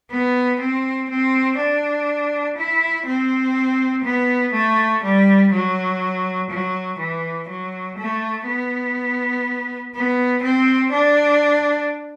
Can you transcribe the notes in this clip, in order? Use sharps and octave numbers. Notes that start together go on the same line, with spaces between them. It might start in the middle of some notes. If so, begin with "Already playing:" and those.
B3
C4
C4
D4
E4
C4
B3
A3
G3
F#3
F#3
E3
F#3
A3
B3
B3
C4
D4